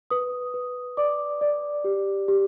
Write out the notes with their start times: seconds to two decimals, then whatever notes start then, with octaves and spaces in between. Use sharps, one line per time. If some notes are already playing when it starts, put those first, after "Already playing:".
0.10 B4 D#6
0.54 B4
0.97 D5 D6
1.41 D5
1.84 G4
2.28 G4